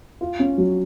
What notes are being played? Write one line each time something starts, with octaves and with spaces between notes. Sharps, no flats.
F4
C#4
F#3